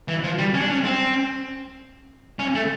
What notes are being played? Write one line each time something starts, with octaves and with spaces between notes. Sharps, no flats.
E3
F3
G3
C#4
D4
C#4
C4
C#4
A3